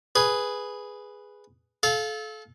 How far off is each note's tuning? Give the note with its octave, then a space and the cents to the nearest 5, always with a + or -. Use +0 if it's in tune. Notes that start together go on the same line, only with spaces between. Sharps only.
G#4 +0 B4 +0
A4 -30 F5 +5